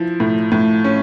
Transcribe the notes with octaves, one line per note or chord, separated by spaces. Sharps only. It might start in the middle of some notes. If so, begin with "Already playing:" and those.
Already playing: F3 E4
A2
A2
C#4